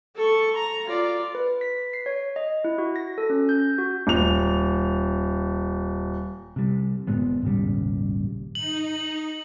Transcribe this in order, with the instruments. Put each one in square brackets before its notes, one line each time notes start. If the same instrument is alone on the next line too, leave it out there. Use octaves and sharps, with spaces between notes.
[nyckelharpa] A4 C#6
A#5
F4 D5
[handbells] B4
B6
C7
C#5
D#5
E4
F#4
A#6
A4
C#4
G6
F#4
[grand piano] D#1 F7
[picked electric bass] C3 G3
F#1 A2 G#3 B3
D#1 G#1 C#3 G3
[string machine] D#4 [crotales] F#7